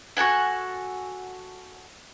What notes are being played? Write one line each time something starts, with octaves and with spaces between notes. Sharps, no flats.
F#4 A4 F#5 G#5